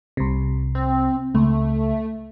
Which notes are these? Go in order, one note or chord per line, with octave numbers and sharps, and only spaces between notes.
C2 C3
C4
C#2 A3